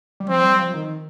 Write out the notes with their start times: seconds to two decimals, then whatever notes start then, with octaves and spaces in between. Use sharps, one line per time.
0.20 G3
0.29 F3 C4
0.43 G3
0.59 F3
0.74 D#3